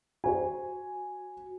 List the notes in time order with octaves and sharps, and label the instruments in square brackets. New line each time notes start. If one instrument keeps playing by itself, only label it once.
[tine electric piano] F#4 [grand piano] C5 G#5